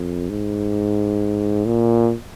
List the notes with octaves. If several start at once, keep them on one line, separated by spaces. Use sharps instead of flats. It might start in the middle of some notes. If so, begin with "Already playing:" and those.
Already playing: F2
G#2
A#2